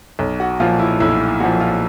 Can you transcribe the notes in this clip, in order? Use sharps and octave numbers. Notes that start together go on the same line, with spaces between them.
B1
F#4
A#2 F3 F4
E4
B1 E4
A#2 F3 F#4
F4